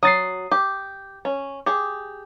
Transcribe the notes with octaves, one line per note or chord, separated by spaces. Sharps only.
F#3 D#6 A6 C7
G4
C#4
G4 G#4